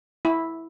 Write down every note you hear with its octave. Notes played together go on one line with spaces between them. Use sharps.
E4